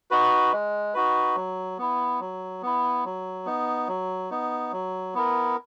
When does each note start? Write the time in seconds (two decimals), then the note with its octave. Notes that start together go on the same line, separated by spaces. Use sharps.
0.11 D#4 F#4 B4
0.52 G#3
0.94 D#4 F#4 B4
1.36 F#3
1.78 B3 E4
2.20 F#3
2.62 B3 E4
3.05 F#3
3.46 B3 D#4
3.88 F#3
4.30 B3 D#4
4.72 F#3
5.14 B3 E4 A#4